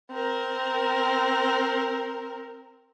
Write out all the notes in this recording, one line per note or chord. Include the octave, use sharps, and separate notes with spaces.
C4 A#4